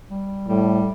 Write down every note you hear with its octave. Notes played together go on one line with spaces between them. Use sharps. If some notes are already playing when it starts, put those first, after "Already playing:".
G3
A2 G3